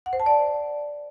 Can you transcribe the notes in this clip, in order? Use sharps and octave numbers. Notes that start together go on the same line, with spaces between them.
F#5
C5
A5
D5